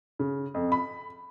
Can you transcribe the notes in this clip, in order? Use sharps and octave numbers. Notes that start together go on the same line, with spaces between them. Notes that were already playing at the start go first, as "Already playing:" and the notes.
C#3
F2
B5